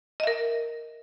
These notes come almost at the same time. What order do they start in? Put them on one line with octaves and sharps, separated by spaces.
D#5 E5 A#4